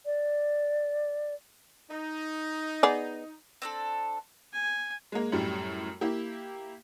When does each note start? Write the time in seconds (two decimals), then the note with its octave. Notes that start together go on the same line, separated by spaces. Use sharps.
0.06 D5
1.91 D#4
2.83 B3 G#4 D5
3.62 C4 D4 A4
4.53 G#5
5.12 G#3 A#3
5.32 F#2 A2 G3
6.01 A#3 E4 G4